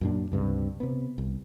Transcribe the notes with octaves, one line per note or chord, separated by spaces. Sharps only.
F#2 A#2 D4
C#2 G2 C3
C3 B3
C2